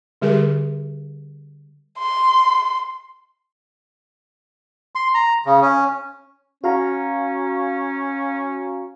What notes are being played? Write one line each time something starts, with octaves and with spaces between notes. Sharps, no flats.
D3 G3 G4 G#4 A#4
C6
C6
A#5
C#3
C#4
C#4 F#4 F5 A#5